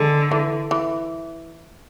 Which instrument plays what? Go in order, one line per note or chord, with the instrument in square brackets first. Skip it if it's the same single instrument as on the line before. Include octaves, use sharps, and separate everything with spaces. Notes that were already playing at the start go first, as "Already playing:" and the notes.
Already playing: [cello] D3 [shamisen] G#3
[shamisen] E3
E3